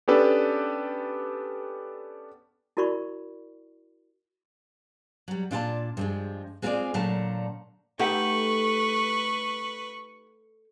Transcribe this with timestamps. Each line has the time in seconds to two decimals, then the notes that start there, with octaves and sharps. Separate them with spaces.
0.08 B3 C#4 D4 G4 A4 B4
2.77 E4 F#4 A#4 D5 B5 C#6
5.28 F#3 G3
5.51 A#2 D4 F4 F#4 D5 A5
5.97 G2 F3 G#3
6.62 G#3 C4 F4 G4 G#4 D5
6.94 A#2 D3 F#3 A3 F5 A5
7.99 A3 D#4 G4 B4 F#5 C#6